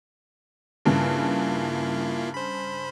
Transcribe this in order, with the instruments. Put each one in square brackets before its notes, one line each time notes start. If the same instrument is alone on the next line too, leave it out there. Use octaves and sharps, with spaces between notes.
[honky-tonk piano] G2 C#3 [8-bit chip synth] A#3 E4 F4
[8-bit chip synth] C5 B5